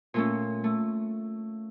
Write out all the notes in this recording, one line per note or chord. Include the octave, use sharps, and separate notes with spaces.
A#2 A3 C#4
A3